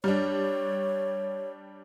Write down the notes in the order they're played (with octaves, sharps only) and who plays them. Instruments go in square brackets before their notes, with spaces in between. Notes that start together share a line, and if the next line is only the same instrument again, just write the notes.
[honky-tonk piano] G3 D4 [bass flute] C#5